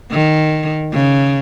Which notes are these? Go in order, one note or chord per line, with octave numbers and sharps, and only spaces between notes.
D#3
C#3